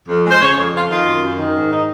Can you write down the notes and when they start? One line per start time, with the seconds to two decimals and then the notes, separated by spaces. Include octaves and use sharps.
0.08 F2
0.25 G#3
0.31 C5
0.41 C#3 C#5
0.53 C#5
0.57 F2
0.73 F2 F4
0.90 D#3 F4
1.06 F#2
1.22 F#2
1.38 D#3
1.55 G#2
1.71 D#4